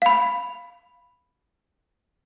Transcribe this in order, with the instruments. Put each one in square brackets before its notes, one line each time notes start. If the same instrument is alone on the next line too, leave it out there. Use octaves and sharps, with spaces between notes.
[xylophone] F5 B5